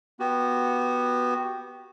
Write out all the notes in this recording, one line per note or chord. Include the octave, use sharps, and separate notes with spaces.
B3 F#4 G4